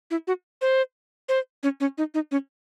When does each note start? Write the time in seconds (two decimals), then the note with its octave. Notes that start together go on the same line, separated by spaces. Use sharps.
0.11 E4
0.27 F#4
0.62 C5
1.29 C5
1.63 C#4
1.80 C#4
1.98 D#4
2.14 D#4
2.31 C#4